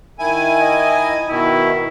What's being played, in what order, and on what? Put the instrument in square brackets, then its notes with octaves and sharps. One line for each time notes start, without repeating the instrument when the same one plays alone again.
[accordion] D#3 E4 G#5
[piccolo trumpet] D#5
[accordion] B2 D#3 [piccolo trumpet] E4